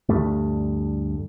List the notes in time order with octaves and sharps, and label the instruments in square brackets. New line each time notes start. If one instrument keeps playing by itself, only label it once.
[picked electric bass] D2 G2 G3 A3